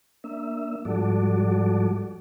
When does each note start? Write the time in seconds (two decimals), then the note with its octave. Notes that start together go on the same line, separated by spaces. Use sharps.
0.24 A#3 D4 E5
0.85 G#2 F3 G3 F#4 A4 D5